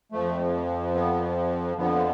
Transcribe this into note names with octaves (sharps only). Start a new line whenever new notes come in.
F2 F3 A3
B3
F2 D3 F3 B3